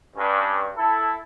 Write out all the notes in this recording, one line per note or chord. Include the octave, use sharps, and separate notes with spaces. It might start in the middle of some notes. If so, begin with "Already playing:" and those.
G2 C#4
E4 A4